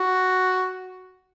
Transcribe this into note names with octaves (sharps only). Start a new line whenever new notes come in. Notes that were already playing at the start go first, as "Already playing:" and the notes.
Already playing: F#4